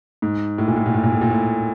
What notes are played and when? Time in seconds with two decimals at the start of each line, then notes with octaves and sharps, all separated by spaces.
0.22 G#2
0.58 A2
0.67 A#2
0.76 A2
0.86 A#2
0.94 A2
1.03 A#2
1.12 A2
1.21 A#2
1.30 A2